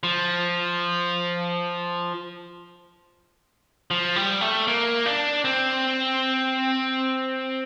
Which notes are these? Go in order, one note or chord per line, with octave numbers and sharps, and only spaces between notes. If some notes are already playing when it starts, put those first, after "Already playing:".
F3
F3
G3
A3
A#3
D4
C4